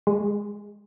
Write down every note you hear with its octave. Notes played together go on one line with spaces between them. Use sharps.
G#3